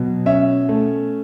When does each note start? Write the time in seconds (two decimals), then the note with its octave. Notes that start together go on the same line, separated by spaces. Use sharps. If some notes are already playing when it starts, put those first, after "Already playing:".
Already playing: B2 F#3
0.26 C#4 E5
0.69 A3